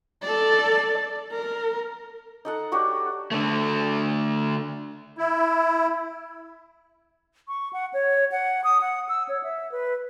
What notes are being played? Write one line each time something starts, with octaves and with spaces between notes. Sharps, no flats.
A4 D5
A#4
D#4 A4 F#5
D4 F#4 G4 C#5
D3 A3
E4
C#6
F#5
C#5
F#5
D#6
F#5
E6
C#5
E5
B4